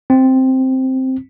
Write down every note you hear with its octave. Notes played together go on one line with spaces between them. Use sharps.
C4